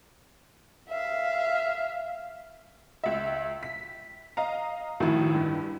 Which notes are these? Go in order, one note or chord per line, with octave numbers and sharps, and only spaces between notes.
E5 F5
C#2 E5
B6
D#5 F5 A#5
D2 A2 D#3 F3 E4
G2